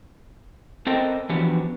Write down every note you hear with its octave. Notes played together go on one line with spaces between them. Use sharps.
C4 A4 A#4 D#5 G5
E3 F3 B3 D4 F#4 G4